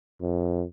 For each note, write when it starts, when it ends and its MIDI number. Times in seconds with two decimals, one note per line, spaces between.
0.21 0.64 41